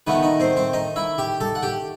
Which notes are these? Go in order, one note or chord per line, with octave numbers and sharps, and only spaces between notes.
D#3 A3 B3 D#4 B4
D#4 D#5
C4 C5
C4 C5
D#4 D#5
E4 E5
G4 G5
A4 A5
F#5
G4 G5